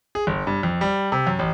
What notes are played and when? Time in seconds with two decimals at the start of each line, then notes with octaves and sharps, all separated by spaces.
0.15 G#4
0.27 G1
0.47 G2
0.63 F2
0.81 G3
1.12 C3
1.27 F#2
1.39 A1